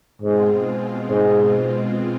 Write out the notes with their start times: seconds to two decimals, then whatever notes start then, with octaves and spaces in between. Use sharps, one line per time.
0.22 G#2 B2 G#3 C4 F4
1.10 G#2